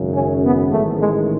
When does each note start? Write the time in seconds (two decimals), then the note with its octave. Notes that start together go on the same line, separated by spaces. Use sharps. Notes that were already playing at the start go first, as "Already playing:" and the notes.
Already playing: G#1 F#2 C#3
0.14 C#4
0.43 B3
0.72 A1 G#2 D#3 A3
1.00 G#3